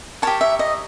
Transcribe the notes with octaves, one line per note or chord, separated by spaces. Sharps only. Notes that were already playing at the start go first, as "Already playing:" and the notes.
G4 A#4 C#5 A5
E5
D#5